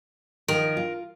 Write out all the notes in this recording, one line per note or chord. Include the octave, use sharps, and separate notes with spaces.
D#3 F3 A#4
F4